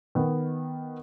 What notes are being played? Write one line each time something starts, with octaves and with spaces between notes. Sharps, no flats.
D#3 B3